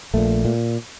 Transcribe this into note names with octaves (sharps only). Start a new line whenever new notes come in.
A#1 A#2 A3
A#2